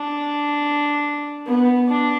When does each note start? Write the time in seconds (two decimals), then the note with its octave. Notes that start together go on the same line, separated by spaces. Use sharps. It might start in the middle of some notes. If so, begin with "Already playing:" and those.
Already playing: D4
1.47 B3
1.88 D4